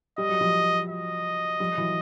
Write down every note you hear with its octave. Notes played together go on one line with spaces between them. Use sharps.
G3 D#5
F#3
F3 G3
D#5
F3 G3
E3 F#3